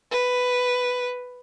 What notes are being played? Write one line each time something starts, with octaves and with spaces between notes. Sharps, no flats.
B4